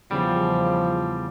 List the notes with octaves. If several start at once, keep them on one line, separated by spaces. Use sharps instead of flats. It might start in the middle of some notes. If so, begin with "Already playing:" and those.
E2 C#3 F3 G3